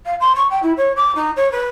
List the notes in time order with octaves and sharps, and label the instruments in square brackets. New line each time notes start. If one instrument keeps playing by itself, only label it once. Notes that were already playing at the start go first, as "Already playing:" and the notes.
[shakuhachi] F5
C6
C#6
G5
E4
C#5
D6
D#4
C#5
B4